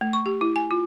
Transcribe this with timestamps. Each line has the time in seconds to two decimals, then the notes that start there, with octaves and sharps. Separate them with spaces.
0.01 A3
0.13 C#6
0.26 G4
0.41 E4
0.56 G#5
0.71 F4